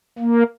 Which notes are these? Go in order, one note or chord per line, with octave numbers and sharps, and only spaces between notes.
A#3